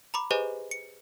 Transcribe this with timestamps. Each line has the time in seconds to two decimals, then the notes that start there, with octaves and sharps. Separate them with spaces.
0.14 A#5 B5 D6
0.31 G4 G#4 B4 C5 D#5 G#5
0.71 C#7